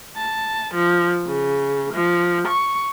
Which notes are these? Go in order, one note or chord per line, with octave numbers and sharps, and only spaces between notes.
A5
F3
C#3
F3
C#6